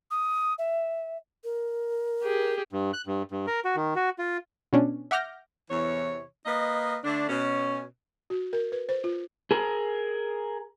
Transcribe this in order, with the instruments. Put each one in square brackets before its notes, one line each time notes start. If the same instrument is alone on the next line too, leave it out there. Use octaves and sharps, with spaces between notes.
[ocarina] D#6
E5
A#4
[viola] G4 G#4
[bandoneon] G2
F#6
G2
G2
A#4
F#4
D#3
F#4
F4
[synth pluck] B2 C#4 D4
E5 F#5 D6 F6 G6 A#6
[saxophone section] E2 C3 E3 C#5
A#3 B4 D#5
D3 A3 D4
B2 C#4
[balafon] F#4
A#4
B4
C5
F4
[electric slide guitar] G#4 A#4